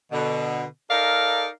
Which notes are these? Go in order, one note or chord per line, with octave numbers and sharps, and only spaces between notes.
B2 D3
D#4 A4 A#4 D5 D#5 F5